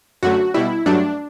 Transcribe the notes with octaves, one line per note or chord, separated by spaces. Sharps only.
F#2 D3 F#3 A3 F#4
B2 G3 E4
G2 F#3 A3 D4